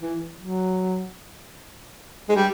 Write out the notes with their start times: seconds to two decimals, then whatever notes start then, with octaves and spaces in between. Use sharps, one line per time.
0.01 E3
0.40 F#3
2.29 G#3
2.36 G3